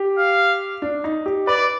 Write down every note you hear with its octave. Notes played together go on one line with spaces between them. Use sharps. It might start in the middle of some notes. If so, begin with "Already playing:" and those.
Already playing: G4
F5
D4
D#4
G4
B4 D5